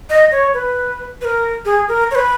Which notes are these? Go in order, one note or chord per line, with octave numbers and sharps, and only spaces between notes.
D#5
C#5
B4
B4
A#4
G#4
A#4
C#5
B4